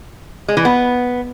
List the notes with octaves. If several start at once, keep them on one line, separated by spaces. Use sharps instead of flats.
G#3
E3
B3